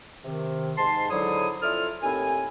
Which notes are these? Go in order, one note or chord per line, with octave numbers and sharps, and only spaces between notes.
C3 D#3
G#2 A5 C6
G#2 D3 F#3 E4 C#5 D#6
F2 E4 F4 A4 D5 F6
D#2 A2 C4 E4 G#5